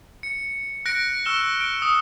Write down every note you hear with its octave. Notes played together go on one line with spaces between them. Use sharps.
C#7
F#6 A#6 C#7 D7
C#6 E6 F6 E7 G7
D7
D#6